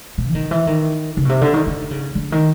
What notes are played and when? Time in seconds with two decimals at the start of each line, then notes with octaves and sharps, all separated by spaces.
0.18 A#2
0.28 E3
0.35 D#3
0.51 E3
0.67 D#3
1.17 C#3
1.25 B2
1.29 C3
1.41 D3
1.54 D#3
1.66 D3
1.91 C#3
2.15 D3
2.32 D#3